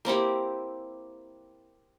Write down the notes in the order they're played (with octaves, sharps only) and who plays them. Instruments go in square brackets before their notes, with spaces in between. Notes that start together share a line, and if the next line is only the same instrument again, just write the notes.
[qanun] A#3 C4 E4 G4